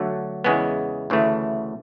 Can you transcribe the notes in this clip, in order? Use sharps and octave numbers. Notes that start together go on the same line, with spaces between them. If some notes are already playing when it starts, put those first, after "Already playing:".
Already playing: D3 F#3 A3
E2 C#3 G#3 B3
D2 C#3 E3 A3